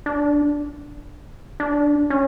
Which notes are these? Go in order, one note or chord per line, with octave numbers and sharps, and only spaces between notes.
D4
D4
C#4